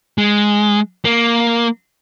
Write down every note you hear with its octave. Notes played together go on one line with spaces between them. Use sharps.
G#3
A#3